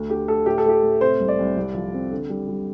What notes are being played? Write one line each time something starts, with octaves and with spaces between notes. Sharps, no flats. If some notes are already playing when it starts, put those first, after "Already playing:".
Already playing: D2
D3 G4
A3 A4
A2 G4
A4
A3 G4
A2
C3 C5
C2
D5
C2
C2
F3
C4
D3
G3
G3